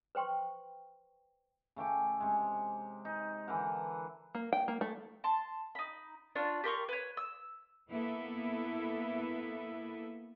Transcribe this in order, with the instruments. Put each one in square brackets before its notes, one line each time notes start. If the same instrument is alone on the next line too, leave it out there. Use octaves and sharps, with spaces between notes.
[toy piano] B4 C5 G5 C6 C#6
[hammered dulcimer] C#3 A3 G5 D6
C3 G#3
D#4
D3 E3 A#4 F#5
[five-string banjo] A#3
G5
A#3
A3
[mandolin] A5 C6
D#4 B5
D4 F4 C#5
G4 A#4 C6 C#6
B4 C#5
E6
[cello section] A#3 B3 E4 A4 B4 E5